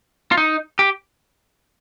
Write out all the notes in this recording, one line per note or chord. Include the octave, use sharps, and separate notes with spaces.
F4
D#4
G4